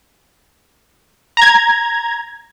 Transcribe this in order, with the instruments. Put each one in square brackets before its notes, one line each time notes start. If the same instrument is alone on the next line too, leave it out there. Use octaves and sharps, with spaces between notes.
[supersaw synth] A#5 G#6